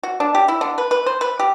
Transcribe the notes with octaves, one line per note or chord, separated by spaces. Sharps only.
F#4
D4
G4
E4
D3
B4
B4
C5
B4
G4